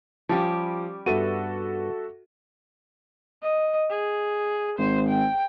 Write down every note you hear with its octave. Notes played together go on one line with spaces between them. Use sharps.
F3 G3 C#4 G4
G2 B3 F#4 A4 E5 D#7
D#5
G#4
G#1 C5
G5